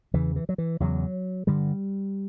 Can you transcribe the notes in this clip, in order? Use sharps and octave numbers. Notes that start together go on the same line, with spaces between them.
E2 C#3 E3
E3
F#3
E3
E2 C#3 F#3
G2 D3 G3